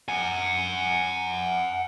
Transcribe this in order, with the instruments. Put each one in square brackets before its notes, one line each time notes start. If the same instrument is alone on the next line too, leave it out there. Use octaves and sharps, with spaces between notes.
[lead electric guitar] F#5 G#5